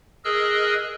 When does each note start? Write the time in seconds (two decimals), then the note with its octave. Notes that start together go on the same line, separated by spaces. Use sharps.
0.25 G#4 A#4 D#5 E6 F#6